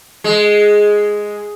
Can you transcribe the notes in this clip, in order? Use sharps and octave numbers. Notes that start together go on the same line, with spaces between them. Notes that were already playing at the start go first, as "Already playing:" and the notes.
G#3